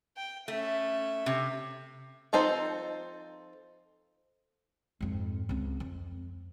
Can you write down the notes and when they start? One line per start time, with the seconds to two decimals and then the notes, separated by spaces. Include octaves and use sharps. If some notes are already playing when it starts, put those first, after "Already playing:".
0.17 G5
0.48 A3 C#4 E5
1.26 C3
2.33 F3 C4 D#4 A4 C5
5.01 F2 G#2
5.49 C#2 C4
5.80 F2